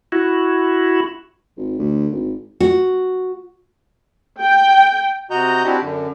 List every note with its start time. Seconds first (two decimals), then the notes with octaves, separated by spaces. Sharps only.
0.12 E4 F#4
1.57 G#1
1.79 D2
2.12 G#1
2.60 F#4
4.41 G5
5.31 C3 F#4 D#5 A#5 G6
5.64 C4 D4 E4 F#4 G4
5.80 F#2 D3